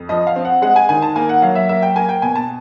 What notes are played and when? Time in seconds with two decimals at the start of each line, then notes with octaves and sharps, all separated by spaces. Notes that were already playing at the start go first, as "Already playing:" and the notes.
Already playing: F2
0.09 F3 D#5
0.27 F5
0.36 C4
0.45 F#5
0.62 G#3 F#5
0.76 G#5
0.89 D#3 G#5
1.02 A5
1.16 A#3 G#5
1.29 F#5
1.42 F#3 F5
1.55 E5
1.69 A#3 E5
1.82 G5
1.96 A#3 G#5
2.09 G5
2.22 B2 G#5
2.35 A5